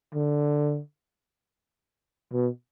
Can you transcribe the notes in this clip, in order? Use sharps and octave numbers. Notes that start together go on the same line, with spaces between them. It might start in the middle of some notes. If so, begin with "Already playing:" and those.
D3
B2